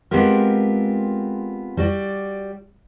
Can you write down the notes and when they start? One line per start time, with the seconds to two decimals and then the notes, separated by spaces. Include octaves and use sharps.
0.11 G#3 B3 C4 F4 G4 A#4
1.77 G3 F#4 D5